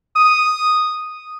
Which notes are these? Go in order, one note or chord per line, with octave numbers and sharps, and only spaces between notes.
D#6